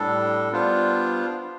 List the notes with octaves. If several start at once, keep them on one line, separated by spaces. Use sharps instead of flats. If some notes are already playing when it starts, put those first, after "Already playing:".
Already playing: A2 G3 D4 A4
G3 B3 D4 F4 C5